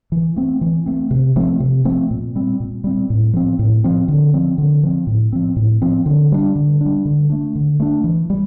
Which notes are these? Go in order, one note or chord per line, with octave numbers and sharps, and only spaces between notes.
E3
A3 C4
E3
A3 C4
C3
F3 A3 C4
C3
F3 A3 C4
A#2
G3 C4
A#2
G3 C4
A2
F3 C4
A2
F3 C4
D3
F3 C4
D3
F3 C4
A2
F3 C4
A2
F3 C4
D3
G3 D4
D3
G3 D4
D3
A3 D4
D3
A3 D4
E3
G3